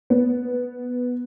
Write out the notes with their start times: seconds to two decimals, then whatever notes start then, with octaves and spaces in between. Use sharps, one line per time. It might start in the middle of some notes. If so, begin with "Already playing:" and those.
0.10 B3